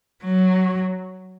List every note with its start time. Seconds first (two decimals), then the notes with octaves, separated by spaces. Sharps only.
0.24 F#3